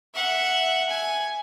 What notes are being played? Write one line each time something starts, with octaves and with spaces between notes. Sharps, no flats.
E5 F#5
G#5